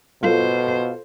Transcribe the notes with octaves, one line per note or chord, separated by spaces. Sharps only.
B2 F4 A4 C5